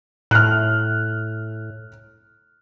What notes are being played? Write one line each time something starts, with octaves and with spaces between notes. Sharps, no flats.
A2 F6 F#6